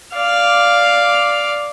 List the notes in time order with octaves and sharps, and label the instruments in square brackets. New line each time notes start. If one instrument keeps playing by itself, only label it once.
[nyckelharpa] D5 F5